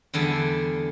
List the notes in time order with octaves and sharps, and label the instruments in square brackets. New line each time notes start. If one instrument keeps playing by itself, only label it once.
[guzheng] E2 D3 G3 G#4 A5